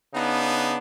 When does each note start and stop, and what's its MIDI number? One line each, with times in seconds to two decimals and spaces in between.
0.14 0.77 49
0.14 0.77 59
0.14 0.77 62
0.14 0.77 63